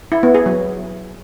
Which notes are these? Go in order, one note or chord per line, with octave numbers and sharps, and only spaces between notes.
E4
B3
G#4
F#3